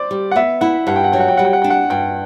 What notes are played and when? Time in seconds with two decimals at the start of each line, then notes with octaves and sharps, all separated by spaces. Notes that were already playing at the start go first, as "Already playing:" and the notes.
Already playing: C5 D5
0.11 G3
0.31 F#5
0.36 B3 E5
0.61 E4 F#5
0.87 G2 F#5
0.96 G5
1.04 F#5
1.12 F#3 G5
1.20 F#5
1.28 G5
1.37 G3 F#5
1.45 G5
1.53 F#5
1.62 D4 G5
1.70 F#5
1.90 G2 G5